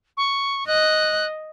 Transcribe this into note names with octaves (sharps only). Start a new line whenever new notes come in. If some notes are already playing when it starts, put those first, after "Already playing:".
C#6
D#5 F#6